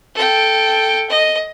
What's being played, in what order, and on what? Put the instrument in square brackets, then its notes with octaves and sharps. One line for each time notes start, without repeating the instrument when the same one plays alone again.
[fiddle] A4 G5
D#5